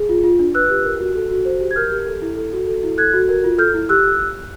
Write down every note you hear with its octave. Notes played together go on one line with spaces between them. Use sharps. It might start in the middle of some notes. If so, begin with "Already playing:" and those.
Already playing: G#4
F4
F4
D4
B4 E6 F#6
G4
A#4
F#4
A4
F#4
C5
G4
G#6
A#4 F6 G6
G4
A4
E4
A4
F#4
A4
E4
A4 F#6 G#6
F#4
A#4
F4
A4 F6 G6
E4
G4 E6 F#6